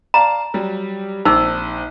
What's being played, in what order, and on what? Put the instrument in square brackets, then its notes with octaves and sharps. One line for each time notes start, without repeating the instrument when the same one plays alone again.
[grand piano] D5 F5 A5 [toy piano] A#5
[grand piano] F#3 G3
[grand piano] A#1 C4 D6 [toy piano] D#4 E6